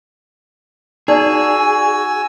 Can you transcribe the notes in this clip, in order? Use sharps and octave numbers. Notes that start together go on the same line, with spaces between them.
D#4 F#4 G#4 D5 G#5 E6